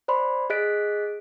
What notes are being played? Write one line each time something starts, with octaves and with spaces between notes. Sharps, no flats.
C5 D5 B5 C6
G#4 D#5 F#6 B6 D7